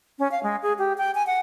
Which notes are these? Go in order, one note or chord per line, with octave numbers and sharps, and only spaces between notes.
C#4
F5
G#3
G#4
G4
G5
G#5
F#5